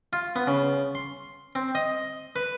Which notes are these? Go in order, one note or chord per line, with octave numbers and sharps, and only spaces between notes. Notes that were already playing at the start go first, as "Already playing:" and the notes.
F4
B3
C#3
C6
C4
D#5
B4